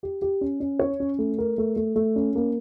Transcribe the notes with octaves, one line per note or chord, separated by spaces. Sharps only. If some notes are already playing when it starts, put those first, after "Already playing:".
G4
G4
C#4
C#4
C#5
C#4
A3
A#4
A3
A3
A3
C#4
A#3